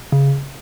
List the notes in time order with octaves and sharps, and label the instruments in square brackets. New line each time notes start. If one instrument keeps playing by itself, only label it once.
[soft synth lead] C#3